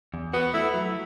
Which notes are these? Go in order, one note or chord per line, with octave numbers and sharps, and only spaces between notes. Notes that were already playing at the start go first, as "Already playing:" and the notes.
E2
B3 F#4
A3 E4
F#3